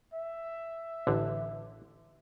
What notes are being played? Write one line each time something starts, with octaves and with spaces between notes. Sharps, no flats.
E5
A1 D3